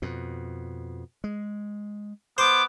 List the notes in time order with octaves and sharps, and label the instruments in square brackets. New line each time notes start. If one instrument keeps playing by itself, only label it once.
[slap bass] F2 B2
G#3
[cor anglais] B3 [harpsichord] C5 [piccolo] D6